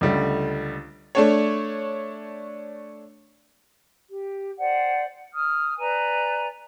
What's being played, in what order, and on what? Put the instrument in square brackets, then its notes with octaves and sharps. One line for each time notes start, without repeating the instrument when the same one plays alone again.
[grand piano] C#2 D3 G3 A3
[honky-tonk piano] A3 D4 C#5
[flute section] G4
C5 D5 F#5 G5
D#6 F6
B4 D5 G#5 A#5